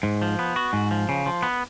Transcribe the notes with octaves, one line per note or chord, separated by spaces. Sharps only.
G#2
F3
B3
F#4
G#2
F3
C#3
F3
B3